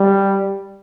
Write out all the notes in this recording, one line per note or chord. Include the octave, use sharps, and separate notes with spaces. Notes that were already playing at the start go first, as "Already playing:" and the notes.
Already playing: G3